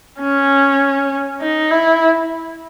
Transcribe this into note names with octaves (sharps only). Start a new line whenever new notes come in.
C#4
D#4
E4